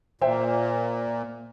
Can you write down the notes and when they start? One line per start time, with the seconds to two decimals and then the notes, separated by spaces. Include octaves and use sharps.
0.21 A#2 C5 E5 G5